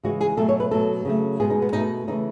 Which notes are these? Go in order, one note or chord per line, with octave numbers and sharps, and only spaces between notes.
C#3 E3 G#3 F#4
G#4
B2 F#3 A3 A4
C#5
B4
B2 F#3 A3 A4
C#3 F#3 A3
B2 G#3 B3 G#4
D#4
B3
B2 A3 D#4
C#3 E3 A3 D#4